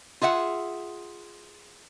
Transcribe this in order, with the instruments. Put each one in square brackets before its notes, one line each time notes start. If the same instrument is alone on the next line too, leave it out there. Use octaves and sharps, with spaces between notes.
[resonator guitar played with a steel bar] F4 G#4 E5 F#5